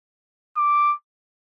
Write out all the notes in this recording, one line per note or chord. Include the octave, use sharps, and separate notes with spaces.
D6